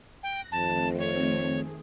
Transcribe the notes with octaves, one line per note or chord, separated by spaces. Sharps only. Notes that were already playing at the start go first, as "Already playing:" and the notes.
G5 F#6 A#6
F2 D#3 A3 C4 A5
C#5
G#4